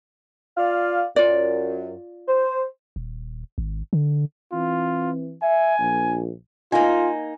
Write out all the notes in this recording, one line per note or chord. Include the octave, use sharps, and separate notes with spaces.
F4 D5 F5
F#2 F4 D5
C5
D#1
G#1
D3
E3 C4 F4
E5 G#5
A#1
A#3 D#4 F4 G#5